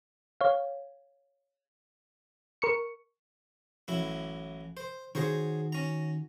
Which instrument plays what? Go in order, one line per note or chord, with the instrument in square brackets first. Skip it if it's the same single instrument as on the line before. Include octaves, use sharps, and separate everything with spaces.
[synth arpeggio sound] C#5 F5
A#4 C#6 C#7
[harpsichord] A1 F#3 E4
C5
[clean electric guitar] D#3 F#4 [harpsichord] G#4 C5 C#5
[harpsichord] C#4 A#5